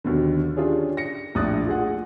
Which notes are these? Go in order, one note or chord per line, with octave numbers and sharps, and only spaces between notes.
D#2 B2 D3
C#4 D4 F4 G4 G#4 C#5
A#6 C#7
A#1 A2 D4 D#6 F#6 A6
F4 G#4 F#5